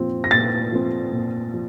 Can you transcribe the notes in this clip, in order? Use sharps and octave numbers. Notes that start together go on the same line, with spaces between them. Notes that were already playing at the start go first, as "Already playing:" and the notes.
Already playing: A#2 F3 C4
A#6
A#2 A6
F3 C4
A#2
F3